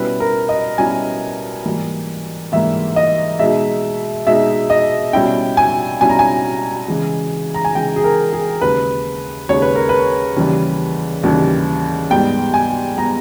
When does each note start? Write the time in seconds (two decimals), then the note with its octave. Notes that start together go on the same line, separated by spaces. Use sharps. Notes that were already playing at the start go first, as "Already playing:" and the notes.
Already playing: B2 G3 C#4 E4 B4
0.20 A#4
0.49 D#5
0.78 B2 G3 C#4 E4 G#5
1.65 G#2 E3 G3 A#3
2.52 G#2 E3 G3 A#3 E5
2.96 D#5
3.39 B2 G#3 D#4 E5
4.27 B2 G#3 D#4 E5
4.70 D#5
5.13 B2 G3 C#4 E4 G5
5.57 G#5
6.00 B2 G3 C#4 E4 G#5
6.09 A#5
6.19 G#5
6.88 C#3 E3 G#3
7.54 A#5
7.65 G#5
7.75 C#3 E3 G#3 G5
7.96 G#4
8.04 A#4
8.33 G#4
8.61 D#2 C#3 G#3 B4
9.49 D#2 C#3 G#3 C#5
9.62 B4
9.75 A#4
9.89 B4
10.36 D#2 C#3 E3 G3
11.23 D#2 C#3 E3 G3
12.10 G#2 G3 B3 G5
12.54 G#5
12.97 G3 B3 A#5